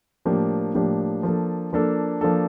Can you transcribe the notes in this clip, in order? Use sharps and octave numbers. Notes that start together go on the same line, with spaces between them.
A2 F3 A#3 D4 G4
A2 F3 A#3 D4 G4
F3 A#3 D4 A4
F3 A#3 D4 A4
F3 A#3 D4 A4